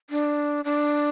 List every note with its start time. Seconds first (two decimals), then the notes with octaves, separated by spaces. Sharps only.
0.10 D4
0.65 D4